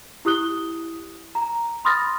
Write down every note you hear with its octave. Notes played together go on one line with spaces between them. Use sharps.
E4 G4 D#6 F#6 G7
A#5
B5 C6 D#6 F6 A6 A#6